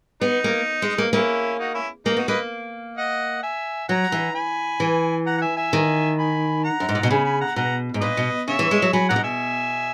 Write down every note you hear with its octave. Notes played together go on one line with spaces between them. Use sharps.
B3 D#4
A#3
G#3
A#3
A#3 C#4 E4
D#4 F#4
C#4 E4
A#3 D#4
B3 D#4 F#4
A#3 B4 D#5
D#5 F#5
E5 G#5
F#3 F#5 A#5
E3
G#5 B5
E3
F#5 A#5
F#5
E5 G#5
E5 G#5
D#3
G#5 B5
F#5 A#5
F#2
G#2
A#2
B2
C#3 G#5 B5
G#5 B5
F#5 A#5
B2 F#5 A#5
G#2
A#2 B4 D#5
B2
C#3 C#5 E5
E3
G#3
F#3
F#3 G#5 B5
A#2 F#5 A#5
B2
E5 G#5